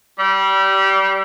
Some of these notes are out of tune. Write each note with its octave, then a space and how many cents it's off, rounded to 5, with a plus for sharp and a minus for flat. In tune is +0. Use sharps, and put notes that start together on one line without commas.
G3 -20